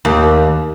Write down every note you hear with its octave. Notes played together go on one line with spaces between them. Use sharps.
D#2